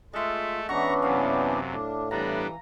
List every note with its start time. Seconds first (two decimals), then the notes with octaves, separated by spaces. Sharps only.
0.13 G#3 A3 F4 A4 E5
0.69 E3 B3 C#4 D4 F#4 A#5 C#6
1.02 F#2 C3 F5
1.71 A2 D4
2.11 E3 G3 B3 D4 A#5